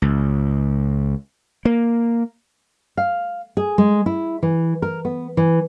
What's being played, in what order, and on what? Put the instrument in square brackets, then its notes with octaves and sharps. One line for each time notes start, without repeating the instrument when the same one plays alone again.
[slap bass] C#2
A#3
[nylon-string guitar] F5
G#4
G#3
E4
E3
A#4
B3
E3